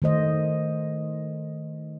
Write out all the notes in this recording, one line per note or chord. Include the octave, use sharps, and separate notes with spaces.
D#3 A3 C5 D#5